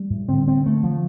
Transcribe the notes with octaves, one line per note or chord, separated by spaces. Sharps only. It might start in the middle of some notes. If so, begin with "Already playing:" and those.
Already playing: G3
A2
D3 C4
C4
A3
F3